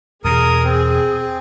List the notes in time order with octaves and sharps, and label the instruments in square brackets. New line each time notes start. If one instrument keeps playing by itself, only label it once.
[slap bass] E2 B2 [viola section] G#4 [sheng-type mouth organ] A#4 D#6
[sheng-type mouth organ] C4